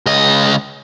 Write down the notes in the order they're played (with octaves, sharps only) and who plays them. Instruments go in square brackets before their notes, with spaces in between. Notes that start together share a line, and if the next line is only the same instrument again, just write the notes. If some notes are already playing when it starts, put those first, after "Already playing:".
[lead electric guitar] C#2 D#5